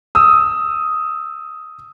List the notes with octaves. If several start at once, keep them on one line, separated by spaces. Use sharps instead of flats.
D#6 E6